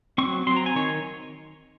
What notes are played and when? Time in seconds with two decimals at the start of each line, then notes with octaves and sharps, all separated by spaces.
0.18 F#3 C4 C#6
0.47 F#3 C6
0.51 C4
0.56 A#5
0.66 G#5
0.76 D#3 C#5